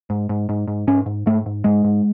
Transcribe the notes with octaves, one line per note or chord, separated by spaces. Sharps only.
G#2
G#2
G#2
G#2
G#2 C#4
G#2
G#2 A3
G#2
G#2 G#3
G#2